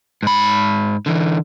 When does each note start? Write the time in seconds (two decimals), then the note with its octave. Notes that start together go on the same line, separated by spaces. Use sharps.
0.23 G#2 B5
1.06 D3 E3